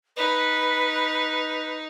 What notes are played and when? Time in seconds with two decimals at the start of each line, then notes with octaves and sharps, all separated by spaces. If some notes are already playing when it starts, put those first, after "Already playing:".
0.16 D#4 B4